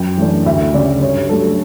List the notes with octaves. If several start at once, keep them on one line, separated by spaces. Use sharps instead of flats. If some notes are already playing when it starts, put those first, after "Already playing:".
Already playing: F#2 G5
E3 A3 D4
D2 E5
C#3 G3 C#4 D5
G2 C#5
F#3 A3 D4 A4